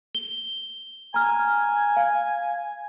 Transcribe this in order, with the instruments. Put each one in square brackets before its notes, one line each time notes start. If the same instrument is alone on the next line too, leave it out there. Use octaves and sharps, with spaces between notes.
[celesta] G7
[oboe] G#5 [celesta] A#5 F6
[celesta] F5